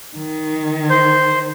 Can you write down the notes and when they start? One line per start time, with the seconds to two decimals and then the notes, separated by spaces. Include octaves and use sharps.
0.17 D#3
0.90 C5